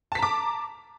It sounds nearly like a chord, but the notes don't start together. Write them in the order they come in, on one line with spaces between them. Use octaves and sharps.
A5 B6 A#5 D6